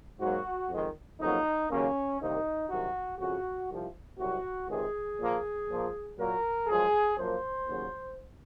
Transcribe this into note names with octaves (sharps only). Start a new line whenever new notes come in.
G#2 F#3 A#3 F#4
F2 D#3 G#3
F2 C#3 F#3 A#3 D#4
D#2 C#3 F#3 A#3 C#4
C2 C3 D#3 A#3 D#4
C2 C3 D#3 F#3 F#4
F2 C#3 F3 F#4
C2 C3 F3
C2 C3 F#3 F#4
C#2 C3 D#3 G#3 G#4
A#2 F3 A#3
A#2 F3 A#3
A#2 F#3 A#3 A#4
F#2 F3 G#3 G#4
F#2 F3 A#3 C5
D#2 C#3 F#3